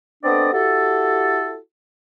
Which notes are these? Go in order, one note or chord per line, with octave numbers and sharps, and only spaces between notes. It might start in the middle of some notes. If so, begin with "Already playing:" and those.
B3 C4 D4 A4 D5 D#5
E4 F#4 G4 A4